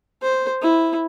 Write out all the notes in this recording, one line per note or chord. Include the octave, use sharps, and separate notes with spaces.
C5
E4